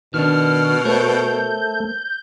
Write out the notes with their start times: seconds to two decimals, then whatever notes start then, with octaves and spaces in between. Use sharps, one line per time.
0.14 B2 D#3 D4 F6
0.85 A3 A#4 C5 C#5 G6